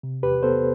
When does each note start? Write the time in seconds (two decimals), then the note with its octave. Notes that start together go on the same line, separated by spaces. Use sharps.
0.03 C3
0.23 E2 G4 B4
0.43 B3 A4 C5